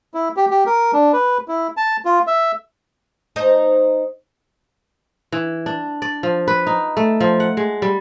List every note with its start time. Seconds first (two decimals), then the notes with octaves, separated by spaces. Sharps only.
0.14 E4
0.37 G4
0.51 G4
0.66 A#4
0.93 D4
1.13 B4
1.48 E4
1.77 A5
2.05 F4
2.27 E5
3.36 D#4 C5 D#5
5.32 E3
5.66 D4
6.02 D5
6.23 F3
6.48 B4
6.67 D#4
6.97 A3
7.20 F3
7.40 F#5
7.57 G#3
7.82 G3